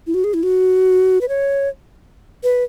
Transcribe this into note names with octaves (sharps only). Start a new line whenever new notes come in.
E4
F#4
G#4
E4
F#4
B4
C#5
B4